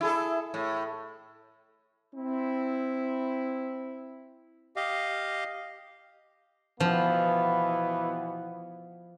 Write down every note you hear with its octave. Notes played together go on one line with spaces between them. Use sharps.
E4 G#4 A4
A2
C4 E4
G4 D#5 F5
B2 E3 F3 B3